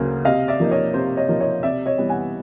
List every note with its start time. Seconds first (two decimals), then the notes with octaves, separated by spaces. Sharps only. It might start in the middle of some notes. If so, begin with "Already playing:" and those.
Already playing: D2 C#3 F#3 A#3
0.25 C3 D#5 F5
0.48 D5 E5
0.60 F3 A#3 D#4
0.71 C#5 D#5
0.94 C3 C5
1.17 C#5 D#5
1.29 F3 A#3 D#4
1.40 C#5 D#5
1.63 C3 D5 E5
1.86 C#5 D#5
1.98 E3 G3 B3
2.09 F#5 G#5